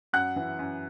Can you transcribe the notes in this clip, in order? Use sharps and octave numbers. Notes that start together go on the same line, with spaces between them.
F#2 F#5 F#6
E3
F#2